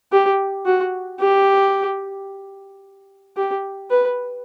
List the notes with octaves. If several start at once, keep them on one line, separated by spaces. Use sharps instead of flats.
G4
F#4
G4
G4
B4